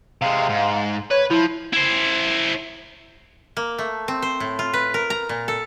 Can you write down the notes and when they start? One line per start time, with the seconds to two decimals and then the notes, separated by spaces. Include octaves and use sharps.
0.22 C3 G#3 F5
0.49 G#2
1.11 B4 C#5
1.30 F3 E4
1.73 E4 C5
3.57 A#3
3.78 A3
4.08 C4
4.22 C5
4.40 A2
4.59 F4
4.73 B4
4.94 A#4
5.10 A#5
5.29 A#2
5.48 A4